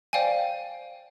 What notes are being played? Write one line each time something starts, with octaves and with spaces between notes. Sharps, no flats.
C5 D5 F5 G5 G#5